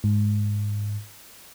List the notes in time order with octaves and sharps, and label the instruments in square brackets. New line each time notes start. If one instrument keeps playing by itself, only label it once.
[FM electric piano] G#2